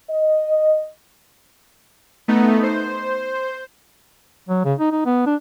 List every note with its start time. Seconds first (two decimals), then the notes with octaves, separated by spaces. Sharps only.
0.10 D#5
2.28 A3 B3 D#4
2.63 C5
4.49 F#3
4.64 C#3
4.79 D#4
4.91 D#4
5.06 B3
5.26 D4